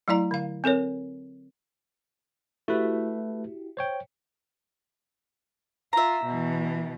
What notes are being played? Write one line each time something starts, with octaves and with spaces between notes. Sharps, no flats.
F#3 A3 E4 D5 A#5
D3 F5
C4 A4 A#4 C#5
A3 E4 F#4 G4 B4
C5 C#5 G5
F4 E5 A#5
B2 E3